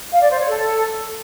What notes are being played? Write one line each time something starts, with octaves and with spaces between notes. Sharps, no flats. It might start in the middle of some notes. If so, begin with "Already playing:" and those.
F5
D5
C5
C#5
A4